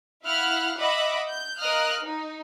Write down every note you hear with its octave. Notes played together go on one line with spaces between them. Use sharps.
E4 F5 F#5 F6 F#6
D#5 E5 F#5 B5 D6
G6
A#4 D#5 F5 D#6 F6 F#6
D#4